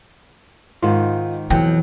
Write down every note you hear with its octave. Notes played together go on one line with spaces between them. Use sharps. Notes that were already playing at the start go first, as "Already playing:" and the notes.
G#2 D#3 F4
F2 B2 E3 F#3 G5